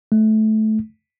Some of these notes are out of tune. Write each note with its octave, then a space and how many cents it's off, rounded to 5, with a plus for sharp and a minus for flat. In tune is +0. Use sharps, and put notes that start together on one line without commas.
A3 -20